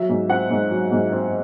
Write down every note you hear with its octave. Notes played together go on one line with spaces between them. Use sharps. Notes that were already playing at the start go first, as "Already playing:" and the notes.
Already playing: F#3 E5
G#2
C4 F#5
G#2
F#3
G#2
C4